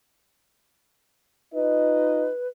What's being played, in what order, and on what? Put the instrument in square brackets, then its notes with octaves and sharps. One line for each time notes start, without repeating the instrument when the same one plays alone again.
[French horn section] D#4 F4 D#5 [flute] B4